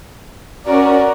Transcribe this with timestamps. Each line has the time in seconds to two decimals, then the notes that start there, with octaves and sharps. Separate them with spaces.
0.65 C#4 F#4 A#4 D5